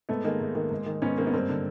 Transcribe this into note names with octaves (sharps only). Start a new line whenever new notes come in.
G#2 A3 B3
D#3 G#3 A#3
G#2
D#3
G#2
D#3
G#2 B3 C#4
D#3 A#3 C4
B3
G2 A#3 C4
D3